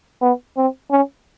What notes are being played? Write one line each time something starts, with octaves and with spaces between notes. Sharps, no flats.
B3
C4
C#4